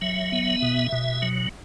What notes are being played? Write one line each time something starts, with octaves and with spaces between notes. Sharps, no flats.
F#3 E5
B3
B2
B2
F#3